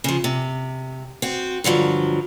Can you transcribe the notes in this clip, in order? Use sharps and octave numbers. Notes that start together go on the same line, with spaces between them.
C#3 F3
C3
C4 F#4
G2 D3 F3 F#3